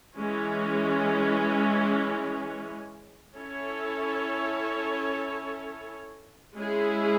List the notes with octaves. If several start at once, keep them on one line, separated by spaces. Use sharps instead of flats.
E3 G#3 C#4
C#4 E4 A4 C#5
G#3 C#4 E4 G#4